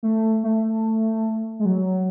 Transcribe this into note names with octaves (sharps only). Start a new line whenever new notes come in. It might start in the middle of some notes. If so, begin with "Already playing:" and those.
A3
A3
G#3
F#3